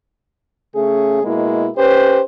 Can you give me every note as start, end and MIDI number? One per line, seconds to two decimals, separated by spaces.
0.75 1.23 49
0.75 1.23 57
0.75 1.23 61
0.75 1.23 68
1.23 1.69 47
1.23 1.69 56
1.23 1.69 58
1.23 1.69 64
1.77 2.21 61
1.77 2.21 67
1.77 2.21 71
1.77 2.21 72